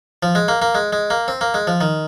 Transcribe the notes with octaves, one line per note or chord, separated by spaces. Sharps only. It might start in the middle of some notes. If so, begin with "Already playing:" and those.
F3
G#3
A#3
A#3
G#3
G#3
A#3
C4
A#3
G#3
F3
D#3